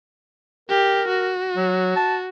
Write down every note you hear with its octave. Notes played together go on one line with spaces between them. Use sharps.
G4 A#4
F#4
F#3
A5